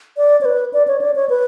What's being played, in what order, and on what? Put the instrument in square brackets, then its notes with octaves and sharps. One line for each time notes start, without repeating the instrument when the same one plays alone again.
[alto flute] D5
C#5
B4
D5
C#5
D5
C#5
B4